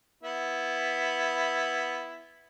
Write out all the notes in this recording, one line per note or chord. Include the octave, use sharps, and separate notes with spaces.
B3 E4